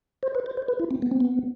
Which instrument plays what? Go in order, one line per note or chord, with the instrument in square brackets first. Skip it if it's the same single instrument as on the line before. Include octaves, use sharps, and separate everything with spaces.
[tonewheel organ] C5
B4
C5
C5
B4
E4
C4
B3
C4
B3